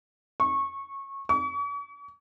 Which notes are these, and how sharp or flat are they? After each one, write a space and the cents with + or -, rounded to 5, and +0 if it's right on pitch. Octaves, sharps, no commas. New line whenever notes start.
C#6 -20
C#6 +40